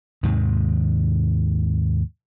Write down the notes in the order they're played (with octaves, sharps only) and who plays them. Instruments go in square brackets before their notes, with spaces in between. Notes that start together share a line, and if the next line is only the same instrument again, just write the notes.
[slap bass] D#2 G#2 C3 D#3